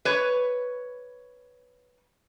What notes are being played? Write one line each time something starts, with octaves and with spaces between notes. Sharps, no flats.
B4 C#5